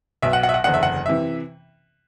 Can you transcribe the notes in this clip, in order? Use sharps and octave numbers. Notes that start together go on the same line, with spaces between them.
B1 B2 E5
F#5
F#5
E5
F#5
F#1 E2 D3 F#5
E5
F#5
C3 E3 E5